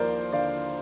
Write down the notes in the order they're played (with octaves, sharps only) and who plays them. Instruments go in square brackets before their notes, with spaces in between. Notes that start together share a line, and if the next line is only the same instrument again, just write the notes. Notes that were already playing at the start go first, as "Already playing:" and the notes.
Already playing: [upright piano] D#2 F3 A#4 C5 D5
D3 D5 F5